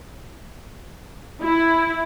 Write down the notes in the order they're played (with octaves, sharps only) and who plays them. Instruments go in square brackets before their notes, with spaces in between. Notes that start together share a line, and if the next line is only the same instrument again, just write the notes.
[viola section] E4